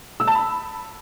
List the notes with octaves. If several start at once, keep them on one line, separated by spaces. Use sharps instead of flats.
E6
A5
B5